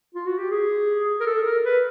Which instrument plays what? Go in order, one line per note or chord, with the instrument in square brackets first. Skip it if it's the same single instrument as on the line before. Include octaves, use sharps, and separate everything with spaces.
[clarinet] F4
F#4
G4
G#4
A#4
A4
A#4
B4